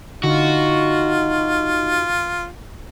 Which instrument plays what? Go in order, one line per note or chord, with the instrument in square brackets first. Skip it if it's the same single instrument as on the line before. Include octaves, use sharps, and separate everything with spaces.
[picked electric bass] D3 [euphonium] D#4 [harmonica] F4 [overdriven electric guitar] F#4